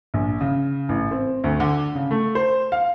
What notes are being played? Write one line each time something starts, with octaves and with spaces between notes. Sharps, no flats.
A#1
C#3
A1
C4
D2
D3
C#3
A3
C5
F5